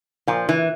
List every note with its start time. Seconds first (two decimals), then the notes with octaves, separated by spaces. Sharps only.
0.28 A#2 F3
0.49 E3